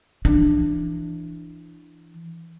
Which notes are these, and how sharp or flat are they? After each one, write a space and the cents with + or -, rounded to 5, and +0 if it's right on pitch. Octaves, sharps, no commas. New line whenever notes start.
E3 +20 D4 +15